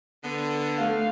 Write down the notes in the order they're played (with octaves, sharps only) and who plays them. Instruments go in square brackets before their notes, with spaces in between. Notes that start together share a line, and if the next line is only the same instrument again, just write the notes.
[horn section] D3 B3
[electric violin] A3 F5